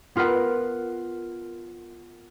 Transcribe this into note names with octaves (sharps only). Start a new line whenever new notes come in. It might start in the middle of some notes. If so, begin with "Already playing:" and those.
B3 F4 A#4 B4 F#5